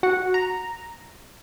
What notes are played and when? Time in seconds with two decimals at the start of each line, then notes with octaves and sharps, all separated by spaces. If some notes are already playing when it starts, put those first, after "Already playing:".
0.03 F#4 F#5
0.34 A#5